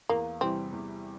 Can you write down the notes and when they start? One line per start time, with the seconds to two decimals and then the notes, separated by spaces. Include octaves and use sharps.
0.09 E2 A#3
0.41 C3 E3 G3 C4
0.72 E2